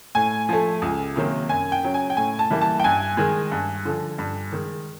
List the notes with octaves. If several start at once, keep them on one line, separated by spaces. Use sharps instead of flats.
A2 G#5
F3 A3
C#2
C3 D#3 F#3 A#3
F#2 G#5
G5
C#3 F#3
G#5
G5
A2 G#5
A5
E3 G3 A#3
A5
G5
G2 G#5
D#3 G#3
G2
D3 F3
G2
D#3 G#3